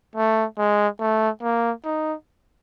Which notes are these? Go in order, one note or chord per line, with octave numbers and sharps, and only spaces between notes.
A3
G#3
A3
A#3
D#4